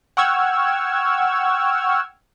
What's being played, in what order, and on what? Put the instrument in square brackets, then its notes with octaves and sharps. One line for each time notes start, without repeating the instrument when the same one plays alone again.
[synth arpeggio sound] F#5 G5 C#6 E6 F6 G#6